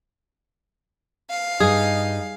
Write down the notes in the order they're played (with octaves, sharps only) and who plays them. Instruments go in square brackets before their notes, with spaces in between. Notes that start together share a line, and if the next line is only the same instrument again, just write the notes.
[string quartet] F5
[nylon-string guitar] G2 [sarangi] D#4 [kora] G#4